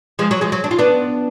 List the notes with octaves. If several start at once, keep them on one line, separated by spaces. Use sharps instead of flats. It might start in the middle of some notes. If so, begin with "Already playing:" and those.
F3 G#3
F#3
F3 G#3
F#3
D4
F4
B3 D4